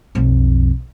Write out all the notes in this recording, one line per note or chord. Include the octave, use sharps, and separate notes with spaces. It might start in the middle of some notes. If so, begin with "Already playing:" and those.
B1 F2